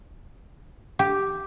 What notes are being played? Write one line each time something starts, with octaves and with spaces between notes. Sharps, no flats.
G4